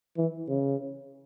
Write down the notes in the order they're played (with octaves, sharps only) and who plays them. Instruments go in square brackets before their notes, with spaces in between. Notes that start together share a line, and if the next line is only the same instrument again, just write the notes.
[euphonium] E3
C#3